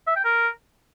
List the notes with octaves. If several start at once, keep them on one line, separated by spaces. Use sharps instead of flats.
E5
G5
A#4